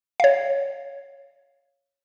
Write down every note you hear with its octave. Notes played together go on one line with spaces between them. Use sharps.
C#5 F5